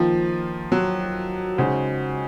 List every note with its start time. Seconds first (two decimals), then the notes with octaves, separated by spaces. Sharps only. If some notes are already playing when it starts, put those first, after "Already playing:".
Already playing: D#3 F3 A#3 F4 C5
0.72 F#3
1.58 C#3 G#3 D#4 F#4 C5